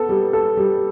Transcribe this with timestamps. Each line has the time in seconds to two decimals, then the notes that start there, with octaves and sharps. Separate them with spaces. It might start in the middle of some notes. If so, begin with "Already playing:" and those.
Already playing: B3 A4
0.09 G3
0.33 A4
0.57 G3